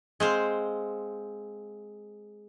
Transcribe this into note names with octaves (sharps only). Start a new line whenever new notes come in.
G#3 C4 C5 F5